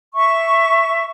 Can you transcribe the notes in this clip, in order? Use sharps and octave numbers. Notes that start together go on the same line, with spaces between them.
E5 C#6